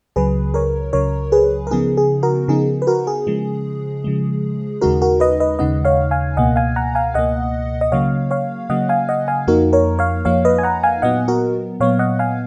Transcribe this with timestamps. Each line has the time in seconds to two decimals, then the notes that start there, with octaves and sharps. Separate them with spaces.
0.16 C#2 C#3 F#3 G#4 B4
0.54 A#4 C#5
0.93 C#2 C#3 F#3 A#4 C#5
1.32 G#4 B4
1.67 A#4
1.71 C#3 F3 B3 D#4 G#4
1.97 G#4
2.23 F#4 A#4
2.48 C#3 F3 B3 D#4 G#4
2.82 B4
2.87 F#4 A#4
3.07 G#4
3.27 C#3 F3 G#3
4.04 C#3 F3 G#3
4.81 D#2 C#3 G#3 D#4 F#4 A#4
5.02 F#4 A#4
5.20 B4 D#5
5.40 B4 D#5
5.59 D#2 C#3 G#3 D#4 D#5 F#5
5.85 C#5 F5
6.11 F5 G#5
6.37 C#2 B2 A#3 D#5 F#5
6.56 F5 G#5
6.76 F#5 A#5
6.95 F5 G#5
7.14 C#2 B2 A#3 D#5 F#5
7.81 D#5
7.92 C#3 F#3 A#3 C#5 F5
8.31 C#5 F5
8.70 C#3 F#3 A#3 D#5 F#5
8.89 F5 G#5
9.09 D#5 F#5
9.28 F5 G#5
9.47 F2 F3 A#3 D#4 F#4 A#4
9.73 A#4 C#5
9.99 C#5 F5
10.25 F2 F3 A#3 D#4 C#5 F5
10.45 B4 D#5
10.58 G#5
10.63 F#5 A#5
10.83 F5 G#5
11.02 A#2 F#3 B3 D#5 F#5
11.28 F#4 A#4
11.80 A#2 F#3 B3 C#5 F5
11.99 D#5 F#5
12.19 F5 G#5